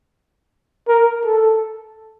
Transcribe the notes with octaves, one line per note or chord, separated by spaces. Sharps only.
A#4
A4